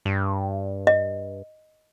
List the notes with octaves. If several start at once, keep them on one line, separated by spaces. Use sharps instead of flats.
G2
D#5